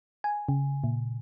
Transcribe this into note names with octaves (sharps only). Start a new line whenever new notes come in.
G#5
C#3
A#2